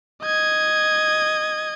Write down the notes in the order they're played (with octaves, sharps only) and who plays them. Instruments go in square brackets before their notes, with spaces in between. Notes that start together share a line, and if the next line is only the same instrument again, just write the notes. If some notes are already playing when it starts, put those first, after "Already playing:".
[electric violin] D#5 G#6